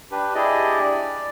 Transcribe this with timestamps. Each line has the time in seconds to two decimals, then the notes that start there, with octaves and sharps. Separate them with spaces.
0.11 D4 G4 B4
0.35 D4 E4 G4 G#4 D5 D#5
0.83 D5